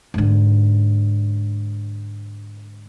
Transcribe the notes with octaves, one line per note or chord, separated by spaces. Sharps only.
G#2 D3